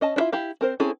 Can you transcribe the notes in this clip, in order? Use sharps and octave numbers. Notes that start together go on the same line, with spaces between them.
C#4 D#5 A5
D4 E4 F4 E5
E4 G4 F5
C4 A#4 C5
C4 C#4 E4 G#4 A4